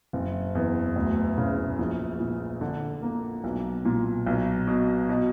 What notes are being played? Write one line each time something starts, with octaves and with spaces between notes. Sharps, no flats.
F#1
E2
D2
C#3
A#1
A#2
D3
A#3
B1
A#2
B1
B2
B2